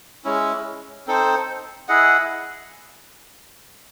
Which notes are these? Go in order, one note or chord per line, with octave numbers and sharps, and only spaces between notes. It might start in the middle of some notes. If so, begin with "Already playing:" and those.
G#3 C#4 E4
C4 D#4 A4 C5
E4 G#4 D#5 F#5